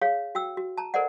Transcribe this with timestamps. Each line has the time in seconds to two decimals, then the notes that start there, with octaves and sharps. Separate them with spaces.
0.02 G#4 C#5 F5
0.35 F#4 G5 E6
0.57 F#4
0.77 A5 A#5
0.94 A4 A#4 C5 D5 D#5 F#5